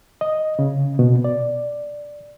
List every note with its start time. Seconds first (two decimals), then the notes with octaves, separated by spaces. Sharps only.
0.21 D#5
0.59 C#3
0.99 B2
1.24 D5